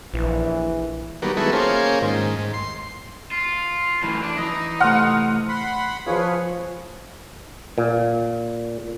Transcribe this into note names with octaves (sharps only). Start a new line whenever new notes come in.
A#1 E3
D#3 F#3 G3 A#3 B3
D#3 F#3 G#3 B3 E4 A4
A#3 C#4 F4 G#4 C5
G#2 D#3
G#2
C6
F4
F#2 A2 E3
D4
E3 D#5 A#5
C3 A3 F#5 C6 F6
F#5 B5 C6
F3 F4 G#4 B4 C#5
A#2